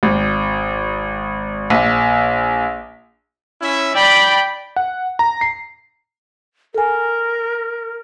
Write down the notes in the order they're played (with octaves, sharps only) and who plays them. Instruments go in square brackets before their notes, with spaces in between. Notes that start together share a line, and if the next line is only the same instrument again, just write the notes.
[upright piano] G#1
A#1
[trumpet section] C#4 E4 E5
[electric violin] D5 B5 [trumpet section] G5
[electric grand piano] F#5
A#5
C7
[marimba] A4 G#5 [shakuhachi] A#4